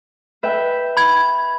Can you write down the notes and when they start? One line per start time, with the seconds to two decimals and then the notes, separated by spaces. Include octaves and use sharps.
0.43 B4 E5 G5
0.97 B5 G#6